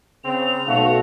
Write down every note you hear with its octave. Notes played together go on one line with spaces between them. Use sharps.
C#3 C4 F7
B1 A3 F#4 F5